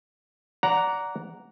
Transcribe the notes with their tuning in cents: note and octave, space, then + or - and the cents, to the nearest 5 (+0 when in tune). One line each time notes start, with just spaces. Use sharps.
D5 -20 F#5 +0 A#5 +0